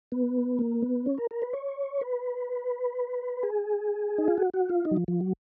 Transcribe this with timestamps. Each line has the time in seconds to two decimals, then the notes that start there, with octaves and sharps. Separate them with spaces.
0.12 B3
0.59 A#3
0.82 B3
1.06 C#4
1.18 A#4
1.31 A#4
1.42 B4
1.53 C#5
2.01 B4
3.43 G#4
4.18 D#4
4.28 F4
4.38 F#4
4.54 F#4
4.69 F4
4.85 D#4
4.91 F#3
4.97 F3
5.08 F3
5.20 F#3